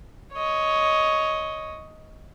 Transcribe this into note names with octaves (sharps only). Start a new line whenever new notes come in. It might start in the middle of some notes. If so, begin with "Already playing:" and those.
C#5 D#5